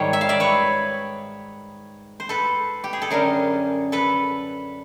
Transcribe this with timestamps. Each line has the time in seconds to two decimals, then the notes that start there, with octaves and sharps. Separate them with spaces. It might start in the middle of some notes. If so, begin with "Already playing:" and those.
Already playing: G#2 D#3 G3 C#5
0.13 E5
0.21 F5
0.29 D5 E5
0.40 B4 C#5
2.20 C5
2.29 A4 B4
2.84 G4
2.93 G#4
3.02 A4
3.11 F#2 D3 G3 G#4 A#4
3.92 A4 B4